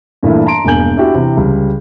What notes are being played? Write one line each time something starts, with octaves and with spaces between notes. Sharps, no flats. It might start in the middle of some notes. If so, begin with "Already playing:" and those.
G2 A#2 E3 A3
A5 A#5 C6 D7
E1 G2 A#3 G#5 G6 F#7
D4 E4 F#4 G4
C3 E3
C#2 G3